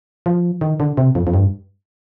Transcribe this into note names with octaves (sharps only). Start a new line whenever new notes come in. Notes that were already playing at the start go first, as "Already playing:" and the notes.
F3
D#3
D3
C3
F2
F2
G2